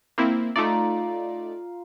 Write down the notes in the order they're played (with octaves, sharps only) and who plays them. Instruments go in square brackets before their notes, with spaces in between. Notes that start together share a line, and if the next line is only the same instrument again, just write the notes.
[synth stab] A#3 C4 E4
[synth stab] A3 D#4 D5 [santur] F4 A#5